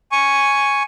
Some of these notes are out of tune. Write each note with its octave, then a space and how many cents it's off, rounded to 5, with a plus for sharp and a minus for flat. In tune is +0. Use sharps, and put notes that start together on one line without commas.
G#5 +0 C#6 +0